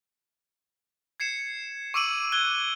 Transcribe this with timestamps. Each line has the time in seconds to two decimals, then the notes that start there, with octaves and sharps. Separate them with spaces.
1.20 G#6 C7 C#7 E7
1.94 C#6 D6 E6 D7 D#7 F#7
2.32 F#6 G#6 G7